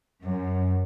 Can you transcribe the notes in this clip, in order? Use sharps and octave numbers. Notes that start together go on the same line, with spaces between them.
F#2